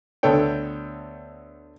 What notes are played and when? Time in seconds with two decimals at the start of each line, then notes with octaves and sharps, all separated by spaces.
0.23 D2 B3 A4 C#5 G5